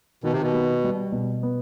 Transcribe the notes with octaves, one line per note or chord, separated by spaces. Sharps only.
B2 D#3
C3
B2
B3
G3
B2
B3